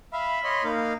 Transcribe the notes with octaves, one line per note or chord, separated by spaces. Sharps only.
E5 F5 B5
C#5 D#5 C6
A#3 D#4 F5